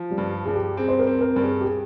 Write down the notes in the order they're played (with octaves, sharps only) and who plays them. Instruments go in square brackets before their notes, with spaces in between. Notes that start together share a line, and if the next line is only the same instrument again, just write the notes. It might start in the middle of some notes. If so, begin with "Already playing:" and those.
Already playing: [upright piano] F3
[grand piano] G3
[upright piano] G2
[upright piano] G2 [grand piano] G#4
[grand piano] G4
[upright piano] C4 [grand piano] G#4
[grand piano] C5
A#4
[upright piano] C4
[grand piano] A#4
[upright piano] G2
[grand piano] G#4
G4
G#4